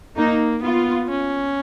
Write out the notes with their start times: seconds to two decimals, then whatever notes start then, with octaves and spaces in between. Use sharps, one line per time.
0.16 A#3 D#4
0.63 B3 F4
1.10 C#4